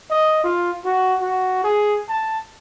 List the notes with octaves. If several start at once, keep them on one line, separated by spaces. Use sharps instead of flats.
D#5
F4
F#4
F#4
G#4
A5